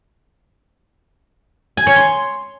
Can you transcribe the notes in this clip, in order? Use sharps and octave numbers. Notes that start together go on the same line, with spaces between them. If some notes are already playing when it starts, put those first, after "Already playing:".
G#5
C#5
C6